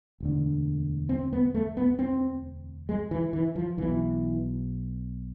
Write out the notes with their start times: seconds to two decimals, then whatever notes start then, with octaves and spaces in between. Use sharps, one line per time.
0.20 E1 D2 D3
1.09 C4
1.33 B3
1.54 A3
1.77 B3
1.99 C4
2.89 G#3
3.11 E3
3.33 E3
3.56 F3
3.77 B1 B2 E3